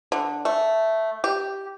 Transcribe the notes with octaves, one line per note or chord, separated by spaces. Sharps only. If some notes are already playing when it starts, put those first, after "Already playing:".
D3
A3
G4